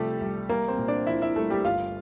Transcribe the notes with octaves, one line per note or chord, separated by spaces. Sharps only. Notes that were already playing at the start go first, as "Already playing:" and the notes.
Already playing: C3 F3 G3 A3 G4 A4
C2
C2 A#3 A#4
C4 C5
A#2
D4 D5
F3 E4 E5
E4 E5
C2 A3 A4
G3 G4
G1 F4 F5